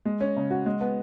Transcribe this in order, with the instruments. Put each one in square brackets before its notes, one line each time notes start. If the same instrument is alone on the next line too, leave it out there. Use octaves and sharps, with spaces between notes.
[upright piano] G#3
C#4
C#3
F#4
G#3
B3